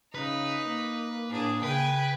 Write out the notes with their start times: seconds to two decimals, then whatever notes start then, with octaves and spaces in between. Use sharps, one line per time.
0.15 C#3 D#4 B4
0.64 A#3
1.31 A2 D4 G#4
1.63 C#3 B4 G5 G#5